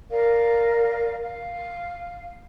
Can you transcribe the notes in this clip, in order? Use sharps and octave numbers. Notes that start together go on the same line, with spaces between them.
A#4 D5 F5
F5